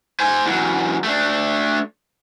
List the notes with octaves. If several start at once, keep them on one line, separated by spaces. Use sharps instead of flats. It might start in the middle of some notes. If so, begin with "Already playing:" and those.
C5 G#5
E2 F#3
A3 D4